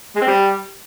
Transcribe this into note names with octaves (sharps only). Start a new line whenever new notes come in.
G#3
C4
G3